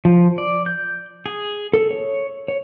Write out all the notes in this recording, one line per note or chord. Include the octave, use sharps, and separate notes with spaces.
F3
D5
G6
G#4
A4
C#5
C#5